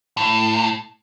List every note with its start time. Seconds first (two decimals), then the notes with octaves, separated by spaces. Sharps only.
0.17 A2